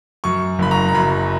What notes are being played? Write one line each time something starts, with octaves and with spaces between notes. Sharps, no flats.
F#2 C#6
F#1 B5
A#5
A#5
F#2 B5